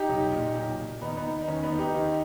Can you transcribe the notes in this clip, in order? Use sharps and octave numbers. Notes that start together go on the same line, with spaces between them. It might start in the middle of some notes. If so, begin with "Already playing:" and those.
Already playing: D#4 G4
B1
A#2
B1
A#2
D#2 B3 D#4
B3 D#4
D#3
D#4
D#2 C#4
B3 D#4
D#3
D#4 G4
D#2